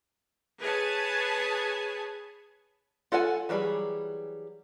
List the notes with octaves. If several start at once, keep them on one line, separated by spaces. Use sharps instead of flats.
G#4 B4 C#5 G#5 A5
F4 A4 F#5 G#5
E3 F#3 G3 G#4